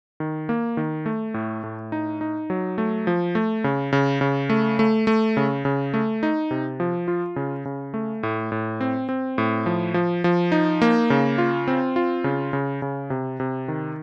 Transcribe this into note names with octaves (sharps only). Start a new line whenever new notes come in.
D#3
A#3
D#3
A3
A2
A2
D#4
D#4
F#3
A3
F3
A3
C#3
C#3
C#3
A3
A3
A3
C#3
C#3
A3
D#4
C3
F3
F4
C#3
C#3
A3
A2
A2
C4
C4
A2
F3
F3
F3
D#4
A#3
C#3
F4
C4
F4
C#3
C#3
C#3
C3
C3
D#3